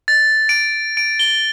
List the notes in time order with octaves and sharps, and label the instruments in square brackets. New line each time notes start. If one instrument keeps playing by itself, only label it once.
[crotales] A6
D7
D7
G7